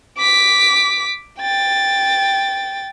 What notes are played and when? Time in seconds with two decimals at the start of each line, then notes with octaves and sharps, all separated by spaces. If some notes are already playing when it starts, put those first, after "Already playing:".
0.18 D6 B6
1.40 G5 A6